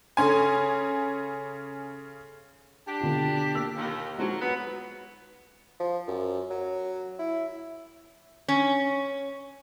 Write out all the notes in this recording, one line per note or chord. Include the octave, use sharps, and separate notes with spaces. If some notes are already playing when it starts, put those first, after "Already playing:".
C#3 C#4 A4 G#5 C6
D4 G4
B2 D3 F4
A#3 E6 B6
D#2
F3 F#3 G#3 D#4 F#4
F#3 B3
F3
F#2
F#3
E4
C#4